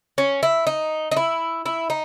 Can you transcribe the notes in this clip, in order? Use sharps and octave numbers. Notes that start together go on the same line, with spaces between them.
C#4
E4
D#4
D#4
E4
E4
D#4